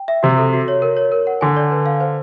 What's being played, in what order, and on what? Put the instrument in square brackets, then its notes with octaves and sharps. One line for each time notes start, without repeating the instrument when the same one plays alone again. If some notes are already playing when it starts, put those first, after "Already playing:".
Already playing: [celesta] G5
E5
[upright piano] C3 [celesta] F#4
[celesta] A4
F#4
C#5
A#4
C#5
A#4
F#5
[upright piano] D3 [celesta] G#5
[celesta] D5
B4
F5
C5